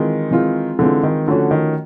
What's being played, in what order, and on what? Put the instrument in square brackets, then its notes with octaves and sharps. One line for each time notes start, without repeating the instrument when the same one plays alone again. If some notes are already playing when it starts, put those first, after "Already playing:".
Already playing: [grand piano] D#3 [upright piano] E3 G#3 C4 F4
[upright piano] E3 G#3 C4 F4
[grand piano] D3 [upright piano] E3 G#3 C4 F4
[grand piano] D#3
[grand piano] D3 [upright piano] F3 A3 C#4 F#4
[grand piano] D#3